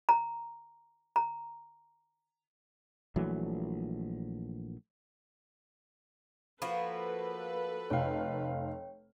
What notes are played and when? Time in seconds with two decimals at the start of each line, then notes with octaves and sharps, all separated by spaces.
0.09 A#5
1.16 A#5
3.16 A#1 E3 F#3 A3
6.62 F3 A#3 F#4 A4 B4 B5
7.90 F1 C#5 F5 G5